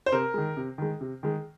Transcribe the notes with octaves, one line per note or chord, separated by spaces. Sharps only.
C5
C3 A#4
D#3 G#3
C3
D#3 G#3
C3
D#3 G#3